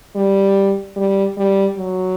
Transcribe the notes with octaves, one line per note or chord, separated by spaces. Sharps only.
G3
G3
G3
F#3